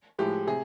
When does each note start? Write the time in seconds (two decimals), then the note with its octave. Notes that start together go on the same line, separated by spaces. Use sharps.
0.19 A2 F3 G#3 G4
0.47 C3 G#4